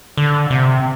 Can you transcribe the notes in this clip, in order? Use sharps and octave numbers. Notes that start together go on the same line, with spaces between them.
D3
C3